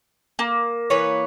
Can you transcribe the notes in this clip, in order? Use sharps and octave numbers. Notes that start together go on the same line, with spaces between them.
A#3
E3 B4 C#5